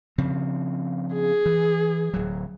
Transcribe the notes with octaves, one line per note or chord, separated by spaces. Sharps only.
C#3 F3 C4
G#4
E3
D1 F#3